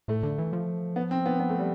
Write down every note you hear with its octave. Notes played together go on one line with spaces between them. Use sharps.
A2 A3
D3
E3
F3
B3
C4
B3
B3
A3
G3